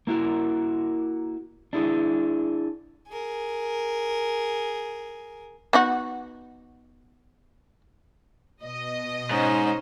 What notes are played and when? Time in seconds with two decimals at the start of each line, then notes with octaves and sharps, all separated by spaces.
0.07 A#3 E4 F#4 A#4
1.73 D4 E4 G#4
3.08 G#4 A#4
5.73 B3 D#4 F#4
8.63 B2 D#5
9.30 G#2 C#4 D#4 C5